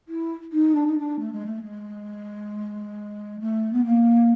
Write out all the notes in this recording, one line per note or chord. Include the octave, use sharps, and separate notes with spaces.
E4
D#4
D4
D#4
D4
A3
G#3
A3
G#3
A3
B3
A#3